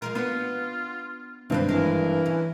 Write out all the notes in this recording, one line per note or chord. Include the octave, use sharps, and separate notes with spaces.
F3 G#3 F4 A#4
B3 D4 F4
G#1 G2 C3 C4 B4 C5
E3 G#3 A#4
C#4